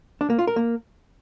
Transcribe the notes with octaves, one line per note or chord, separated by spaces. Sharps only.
D4
A#3
F4
A#4
A#3